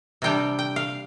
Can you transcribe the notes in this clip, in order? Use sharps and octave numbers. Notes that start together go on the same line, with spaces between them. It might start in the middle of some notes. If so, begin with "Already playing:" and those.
C3 G3 D4 G5
G5
F5